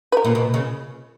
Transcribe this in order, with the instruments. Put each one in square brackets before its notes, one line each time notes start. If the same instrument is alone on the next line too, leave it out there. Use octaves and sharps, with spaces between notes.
[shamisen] B4
A#4
[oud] A#2
B2
C#3